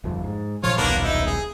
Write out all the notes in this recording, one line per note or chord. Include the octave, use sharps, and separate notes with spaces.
G1 F2
G#2
F#1 A#2 F3 F4 C#5
D#1 B1 G2 A#3 B3 D4
D#4 E4
G#4